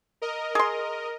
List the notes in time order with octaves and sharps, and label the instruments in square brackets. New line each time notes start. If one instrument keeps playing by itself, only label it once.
[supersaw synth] A#4 D#5
[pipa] G#4 C6